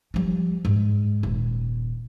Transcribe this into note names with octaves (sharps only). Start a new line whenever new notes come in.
F3 G3
G#2
D#1